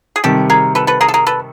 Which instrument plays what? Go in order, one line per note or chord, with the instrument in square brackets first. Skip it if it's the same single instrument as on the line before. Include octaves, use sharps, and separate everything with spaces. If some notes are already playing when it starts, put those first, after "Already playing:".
[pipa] G#4
[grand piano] C3 D#3 G3 [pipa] G4 A4
[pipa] G#4 A#4
A4 B4
A4 B4
G#4 A#4
A4
G#4 A#4
A4 B4